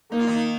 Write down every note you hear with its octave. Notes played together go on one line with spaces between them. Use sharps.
A#3 D#4
F4
D#3 D#4